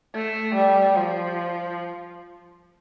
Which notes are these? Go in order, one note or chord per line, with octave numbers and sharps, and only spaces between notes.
A3
G3
F3